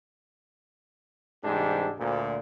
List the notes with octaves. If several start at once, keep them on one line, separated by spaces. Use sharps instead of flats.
C2 G#2 E3 D4 G4
D2 A#2